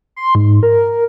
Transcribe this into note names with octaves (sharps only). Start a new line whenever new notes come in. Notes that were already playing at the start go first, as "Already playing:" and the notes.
C6
G#2
A#4